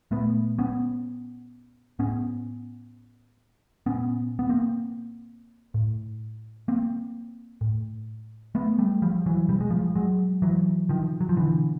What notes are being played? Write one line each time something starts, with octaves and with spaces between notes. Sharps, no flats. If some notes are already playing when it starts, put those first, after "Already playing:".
A#2 A3 B3
B3 C#4
A2 B3 C#4
A#2 B3 C#4
B3
A#3 C4
A2
A#3 C4
A2
A3 B3
G3 A3
F3 G3
E3 F#3
B2 G3
G#3
F3 G3
F#3 G#3
E3 F#3
D#3 F3
F#3
F3
B2 D3 E3